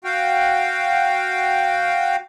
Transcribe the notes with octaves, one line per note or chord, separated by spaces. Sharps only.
F#4 F5 G5